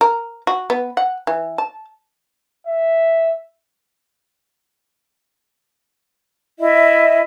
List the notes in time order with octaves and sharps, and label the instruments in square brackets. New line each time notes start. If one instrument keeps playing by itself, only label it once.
[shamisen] A#4
F#4
B3
F#5
E3
A5
[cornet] E5
[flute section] E4 D#5 E5